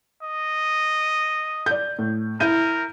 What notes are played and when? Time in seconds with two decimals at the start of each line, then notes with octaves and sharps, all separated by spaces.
0.23 D#5
1.66 D5 G6
1.99 A2
2.40 E4 A#4 G6 D#7